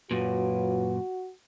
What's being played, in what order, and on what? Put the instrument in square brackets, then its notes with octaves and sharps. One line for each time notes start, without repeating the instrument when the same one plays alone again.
[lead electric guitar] F#2 A#2 [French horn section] F#3 F4 B4 [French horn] F#4